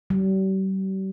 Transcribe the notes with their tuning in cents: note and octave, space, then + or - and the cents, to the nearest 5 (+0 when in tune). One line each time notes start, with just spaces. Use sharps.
G3 -40